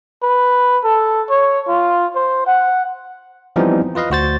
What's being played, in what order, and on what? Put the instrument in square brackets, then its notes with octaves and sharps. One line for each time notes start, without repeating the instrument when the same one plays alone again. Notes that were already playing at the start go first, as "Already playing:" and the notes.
[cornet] B4
A4
C#5
F4
C5
F#5
[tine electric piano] E3 F3 G3 B3 C4 D#4
F4 B4 D#5 F5
D2 F#4 C5 A6